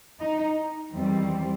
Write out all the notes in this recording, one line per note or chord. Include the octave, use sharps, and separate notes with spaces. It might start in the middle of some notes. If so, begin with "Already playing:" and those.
D#4
E2 D#3 G3 C4